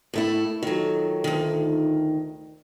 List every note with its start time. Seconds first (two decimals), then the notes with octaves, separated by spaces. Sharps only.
0.14 A2 A3 E4
0.63 D#3 F#3 D#4 F4 A4
1.24 D2 D#3